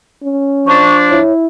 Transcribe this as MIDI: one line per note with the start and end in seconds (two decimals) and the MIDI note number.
0.23 0.83 61
0.67 1.18 53
0.67 1.18 62
0.67 0.97 85
1.10 1.47 64
1.10 1.33 73